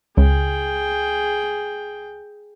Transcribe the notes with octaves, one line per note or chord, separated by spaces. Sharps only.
C#2 G#4 G5